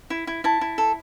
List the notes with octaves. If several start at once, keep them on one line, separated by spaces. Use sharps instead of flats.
E4
E4
E4 A5
E4
A4